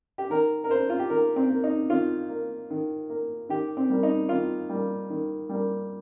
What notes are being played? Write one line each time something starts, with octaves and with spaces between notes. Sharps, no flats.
G4
D#3 A#4
A#4
A#3 C5
F4
G4
D#3 A#4
C4
A#3
D#4
D#3 F4
A#3
D#3
A#3
D#3 G4
C4
G3 A#3
D#4
D#3 F4
G3 A#3
D#3
G3 A#3